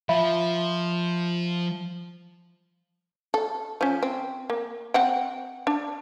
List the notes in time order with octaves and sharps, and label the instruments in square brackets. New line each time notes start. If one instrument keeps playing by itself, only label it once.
[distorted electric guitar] F3 [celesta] E5 F5 B5
[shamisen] A4
F3 C#4
C4
A#3
C4 F#5 G5
D4